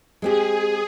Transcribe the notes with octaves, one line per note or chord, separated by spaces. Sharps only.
G#3 C4 G4 G#4